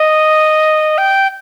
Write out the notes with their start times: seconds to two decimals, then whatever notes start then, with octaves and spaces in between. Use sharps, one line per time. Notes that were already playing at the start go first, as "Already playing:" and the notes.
Already playing: D#5
0.98 G5